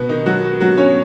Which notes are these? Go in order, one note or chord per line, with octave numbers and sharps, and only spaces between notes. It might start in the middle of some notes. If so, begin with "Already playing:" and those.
Already playing: B2 B3
D#3 D#4
F#3 F#4
F#3 F#4
C#4 C#5